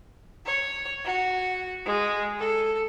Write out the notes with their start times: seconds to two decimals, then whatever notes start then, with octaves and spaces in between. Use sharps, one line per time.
0.45 C#5
1.05 F#4
1.86 G#3
2.39 A4